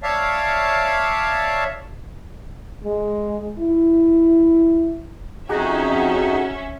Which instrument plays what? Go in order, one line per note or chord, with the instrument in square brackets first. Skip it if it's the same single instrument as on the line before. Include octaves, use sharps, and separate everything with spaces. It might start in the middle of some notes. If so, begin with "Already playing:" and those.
[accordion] C#5 D5 E5 F5 A5
[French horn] G#3
E4
[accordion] F2 D#4 [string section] C#4 E5 [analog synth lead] F#4 [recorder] G#4